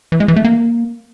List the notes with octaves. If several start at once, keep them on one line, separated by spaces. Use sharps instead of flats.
E3
G#3
E3
A3
A#3